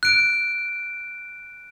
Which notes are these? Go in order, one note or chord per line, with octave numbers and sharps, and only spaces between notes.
F#6 D7